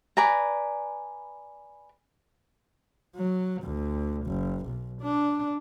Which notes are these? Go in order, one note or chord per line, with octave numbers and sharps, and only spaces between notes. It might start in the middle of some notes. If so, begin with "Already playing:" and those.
B4 D5 G#5 A#5
F#3
D2
F#1
B1
D4